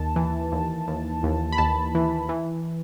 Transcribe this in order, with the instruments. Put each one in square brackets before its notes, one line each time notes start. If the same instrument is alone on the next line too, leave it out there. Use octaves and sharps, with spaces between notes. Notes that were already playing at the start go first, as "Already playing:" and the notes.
Already playing: [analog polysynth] D#2 A5
E3
D#2
D#2
D#2
B5
D#2 A5
E3
E3